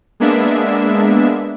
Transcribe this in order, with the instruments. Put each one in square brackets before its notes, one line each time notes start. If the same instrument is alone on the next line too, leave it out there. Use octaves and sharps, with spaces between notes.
[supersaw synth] G#3 A#3 B3 D4 E5